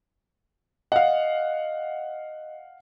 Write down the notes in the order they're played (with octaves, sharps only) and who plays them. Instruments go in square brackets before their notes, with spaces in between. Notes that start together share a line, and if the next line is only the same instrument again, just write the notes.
[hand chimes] D#5 [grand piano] F5 F#5